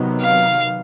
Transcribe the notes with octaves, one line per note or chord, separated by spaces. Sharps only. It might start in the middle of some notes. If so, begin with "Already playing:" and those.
Already playing: C3 D#3 F#3 B3
F5